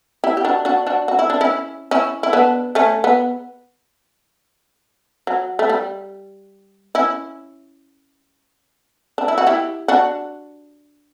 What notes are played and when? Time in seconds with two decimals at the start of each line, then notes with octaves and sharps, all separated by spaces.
0.24 E4 G4
0.37 G4
0.45 D4 F#4
0.65 D4 F#4
0.87 D4 F#4
1.08 F#4
1.19 E4
1.30 D4
1.41 C#4 E4
1.91 C#4 E4
2.23 E4
2.33 B3 D4
2.75 A3 C#4
3.04 B3
5.27 F#3
5.59 A3
5.69 G3
6.95 C#4 E4
9.18 D4
9.28 E4
9.38 F#4
9.47 E4 G4
9.88 D4 F#4